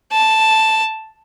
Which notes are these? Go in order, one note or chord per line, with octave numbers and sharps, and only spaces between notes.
A5